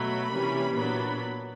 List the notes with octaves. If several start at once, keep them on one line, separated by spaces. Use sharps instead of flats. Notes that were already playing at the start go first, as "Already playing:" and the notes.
Already playing: B2 F#3 A3 B5
C3 E3 G3 A#3 C#4
A#2 F#3 B3 D4 B5